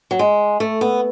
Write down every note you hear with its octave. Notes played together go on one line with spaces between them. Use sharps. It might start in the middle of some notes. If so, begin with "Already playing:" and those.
F#3
G#3
A3
B3